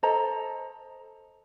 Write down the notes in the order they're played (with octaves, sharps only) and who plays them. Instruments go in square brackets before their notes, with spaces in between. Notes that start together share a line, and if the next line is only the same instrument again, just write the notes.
[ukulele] A4 C5 D#5 A#5